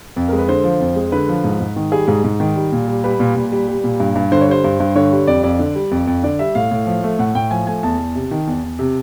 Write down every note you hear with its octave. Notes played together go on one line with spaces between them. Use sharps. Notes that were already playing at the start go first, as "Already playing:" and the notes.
F2
G#3 A#4
B4
D3 C5
F3
F2
G#3
D3 B4
F3
G#2
G#2
D#3
G3 G#4
G#2 G#4
G#2
D#3
G3
A#2
G3
G3 B4
A#2
A#2
G3
G3
A#2
G2
G2
D3 C5
C#5
G3 C5
G2
G2
D3 C#5
G3
F2 D5
F2 D5
D3
G3
F2
F2
D3 D5
G3 E5
A2 F5
A2
F3
A3
A2 F#5
A2 G5
F3 G#5
A3 G#5
E2 A5
E2
C3
D#3
E2
E2
C3